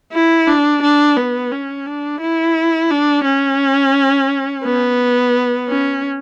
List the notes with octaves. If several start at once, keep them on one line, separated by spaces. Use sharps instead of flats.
E4
D4
D4
B3
C#4
D4
E4
D4
C#4
B3
C#4